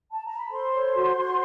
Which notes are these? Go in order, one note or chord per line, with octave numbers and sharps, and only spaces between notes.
A5
A#5
B5
A4 C5 C6
C#5
F#4
F#4